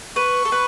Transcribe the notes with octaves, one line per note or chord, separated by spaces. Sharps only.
B4 C#6
A4
B4